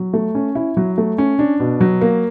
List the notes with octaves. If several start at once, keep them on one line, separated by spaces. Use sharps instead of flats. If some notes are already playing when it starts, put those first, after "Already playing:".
Already playing: F#3
A3
C#4
E4
F#3
A3
C#4
D4
B2
F#3
A#3